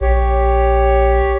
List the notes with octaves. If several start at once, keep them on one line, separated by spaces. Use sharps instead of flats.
A#1 G4 C#5